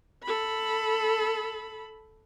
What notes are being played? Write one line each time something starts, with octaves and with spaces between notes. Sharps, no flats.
A4 B5